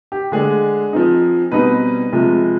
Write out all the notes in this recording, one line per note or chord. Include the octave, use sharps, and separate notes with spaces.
G4
D3 G#3 D4 G#4
F3 C4 D#4
B2 G3 C4 D#4 B4
C3 F3 G#3